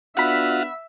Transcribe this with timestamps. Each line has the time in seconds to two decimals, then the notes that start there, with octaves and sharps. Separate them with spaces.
0.17 B3 D4 F4 F#4 E5 F#5 B5